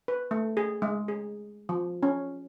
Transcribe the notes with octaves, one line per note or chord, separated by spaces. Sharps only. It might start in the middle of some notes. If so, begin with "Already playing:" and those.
B4
A3
G#4
G#3
G#4
F3
C#4